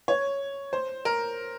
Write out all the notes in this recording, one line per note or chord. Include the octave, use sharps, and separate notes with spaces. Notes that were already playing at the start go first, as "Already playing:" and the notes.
C#5
C5
A#4